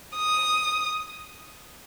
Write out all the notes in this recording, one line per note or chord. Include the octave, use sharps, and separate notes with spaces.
D#6